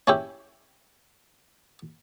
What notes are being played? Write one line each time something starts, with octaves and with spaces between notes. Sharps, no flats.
C#4 E4 G4